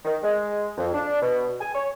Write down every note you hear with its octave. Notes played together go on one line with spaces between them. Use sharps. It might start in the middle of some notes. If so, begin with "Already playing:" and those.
D#3
G#3
F2
D4
B2
G#5
C#5